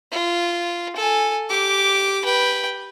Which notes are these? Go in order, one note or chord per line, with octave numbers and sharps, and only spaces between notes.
F4
A4 G#5
G4 D6
B4 G5